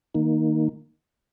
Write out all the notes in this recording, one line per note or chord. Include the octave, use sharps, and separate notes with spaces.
D#3 A#3 D#4